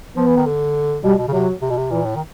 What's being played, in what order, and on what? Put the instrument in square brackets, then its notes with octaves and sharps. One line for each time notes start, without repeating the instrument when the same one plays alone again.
[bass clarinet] F3 [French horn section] B3
[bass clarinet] E3
D#3
D3
[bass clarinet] B2 [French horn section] G3
[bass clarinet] B2
C#3
[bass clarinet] C3 [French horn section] F#3
[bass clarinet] C3
B2
C3
[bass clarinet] A#2 [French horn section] E3
[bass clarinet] A2
D#3